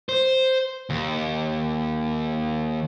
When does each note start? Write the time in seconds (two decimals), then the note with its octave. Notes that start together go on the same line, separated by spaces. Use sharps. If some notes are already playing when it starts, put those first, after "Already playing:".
0.09 C5
0.90 D#2